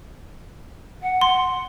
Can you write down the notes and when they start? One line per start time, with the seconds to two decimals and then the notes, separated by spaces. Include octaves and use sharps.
1.02 F#5
1.21 C6